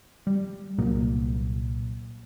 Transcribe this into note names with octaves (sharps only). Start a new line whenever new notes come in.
G3
C2 A#2 F#3 A#3